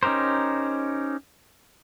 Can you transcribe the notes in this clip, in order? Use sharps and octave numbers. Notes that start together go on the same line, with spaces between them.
C#4 D#4 G4 A#4 C5